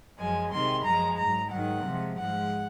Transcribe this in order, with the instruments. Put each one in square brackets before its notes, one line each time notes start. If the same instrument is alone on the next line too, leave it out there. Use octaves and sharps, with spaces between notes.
[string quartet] F#2 F3 G#3 G#5
C3 D#3 G#3 C6
F#2 F3 G#3 A#5
G#2 F#3 A#5
G#2 D#3 F#3 F#5
C3 F3 G#3
G#2 F3 G#3 F#5